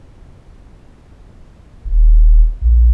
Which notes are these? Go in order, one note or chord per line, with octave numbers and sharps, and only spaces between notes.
D#1
A#1